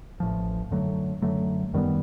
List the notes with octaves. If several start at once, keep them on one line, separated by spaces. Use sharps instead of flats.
A1 A2 F3
F#2 D3 F#3 A3
F#2 D3 F#3 A3
F#2 D#3 G3 B3